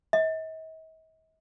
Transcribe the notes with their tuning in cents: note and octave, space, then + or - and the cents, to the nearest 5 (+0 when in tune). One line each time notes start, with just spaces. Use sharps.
D#5 +45